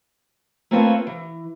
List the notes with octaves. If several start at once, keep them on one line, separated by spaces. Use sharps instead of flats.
A3 A#3 C4 F4 B4 C#5
E3